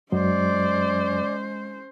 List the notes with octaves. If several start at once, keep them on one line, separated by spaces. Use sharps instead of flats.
F#2 F#3 G#3 C#4 C5 D5